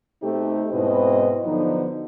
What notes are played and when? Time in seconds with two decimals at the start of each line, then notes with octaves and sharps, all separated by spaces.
0.23 B2 A3 C4 D#4 G4 A4
0.71 G#2 B2 C4 E4 B4 D#5
1.45 D3 F3 F#3 B3 D#4